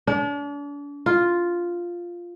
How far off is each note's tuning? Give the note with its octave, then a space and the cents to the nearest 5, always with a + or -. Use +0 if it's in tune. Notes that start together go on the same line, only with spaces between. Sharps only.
D4 -40
F4 +0